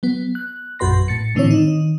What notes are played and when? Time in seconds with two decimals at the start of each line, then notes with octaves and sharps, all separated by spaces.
0.03 F#3 B3
0.35 F#6
0.79 A#1 F#2 F#4 B4 C6 A#6
1.08 A2 A6 C#7
1.35 A2 D3 E3 C4 C#5
1.51 D#3 D#4